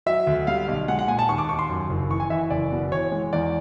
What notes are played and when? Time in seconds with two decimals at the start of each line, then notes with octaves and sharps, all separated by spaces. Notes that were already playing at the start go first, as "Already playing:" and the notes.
0.06 F#3 E5
0.27 D2
0.47 G3 F5
0.68 B1
0.88 G#3 F#5
0.99 F#5
1.08 A#2 G#5
1.19 A5
1.29 D#2 C#6
1.38 D6
1.49 D#2 C#6
1.59 C6
1.69 F#2
1.89 F#1
2.10 E3 C#6
2.20 G#5
2.30 E3 E5
2.50 F#1 D5
2.71 B2
2.91 E3 C#5
3.12 G#3
3.33 E2 D5